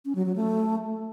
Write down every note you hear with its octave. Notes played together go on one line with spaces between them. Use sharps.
C#4
F#3
F#3
A3